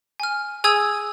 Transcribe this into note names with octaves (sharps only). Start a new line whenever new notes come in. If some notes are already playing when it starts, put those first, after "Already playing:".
G#5 F6
G#4 G#5 D#6 E6 G#6